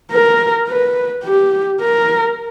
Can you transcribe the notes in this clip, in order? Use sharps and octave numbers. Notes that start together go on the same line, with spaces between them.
A#4
B4
G4
A#4